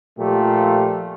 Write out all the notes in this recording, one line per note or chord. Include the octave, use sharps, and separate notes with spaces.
A#2 F3 A3 F4 G4